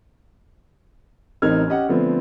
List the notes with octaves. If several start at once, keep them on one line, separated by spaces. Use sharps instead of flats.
A1 C4 D#4 A#4 F6 G#6
C#4 G4 D#5 F#5
D3 F3 A3 B3 C4